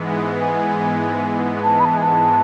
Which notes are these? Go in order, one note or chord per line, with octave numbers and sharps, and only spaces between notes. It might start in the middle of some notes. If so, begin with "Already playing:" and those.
Already playing: G#2 E3 G#3 B3
G#5
A5
B5
A5
G#5
A5